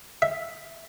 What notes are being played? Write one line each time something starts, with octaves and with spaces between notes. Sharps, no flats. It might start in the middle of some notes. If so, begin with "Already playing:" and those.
E5